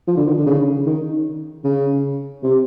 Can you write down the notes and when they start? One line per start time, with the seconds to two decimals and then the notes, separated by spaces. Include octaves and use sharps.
0.07 F3
0.17 D3
0.27 D#3
0.37 D3
0.46 C#3
0.86 D#3
1.64 C#3
2.43 C3